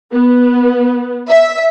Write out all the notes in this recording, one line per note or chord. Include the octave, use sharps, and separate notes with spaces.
B3
E5